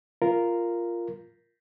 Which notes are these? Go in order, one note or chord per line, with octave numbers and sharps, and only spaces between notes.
F4 A#4